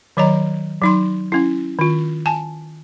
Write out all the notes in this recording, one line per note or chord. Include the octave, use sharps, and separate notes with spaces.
D#3 F#3 C#5 D#5 A#5
F#3 D#4 C6
C#4 E4
D#3 F4
G#5 A5